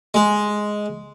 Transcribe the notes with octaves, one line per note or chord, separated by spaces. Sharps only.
G#3